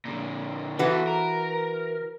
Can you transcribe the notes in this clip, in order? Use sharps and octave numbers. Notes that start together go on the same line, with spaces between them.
A#2 D3
E3 B3 F#4 A4 B4
A#4